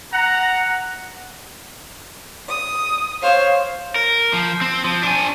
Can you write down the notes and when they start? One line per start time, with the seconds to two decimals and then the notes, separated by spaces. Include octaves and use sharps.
0.13 F#5 A#5
2.48 D#6
3.22 C5 C#5 F5
3.96 A#4
4.33 F3
4.61 C4
4.84 F3
5.03 D4 G#5